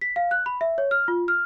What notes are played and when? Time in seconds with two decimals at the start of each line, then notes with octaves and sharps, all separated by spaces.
0.01 B6
0.16 F5
0.31 F#6
0.46 B5
0.61 E5
0.78 C#5
0.91 F6
1.08 F4
1.28 F6